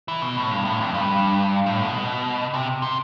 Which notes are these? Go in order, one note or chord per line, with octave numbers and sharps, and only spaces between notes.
E3
B2
A2
G2
A2
F2
G2
A2
B2
C3
C3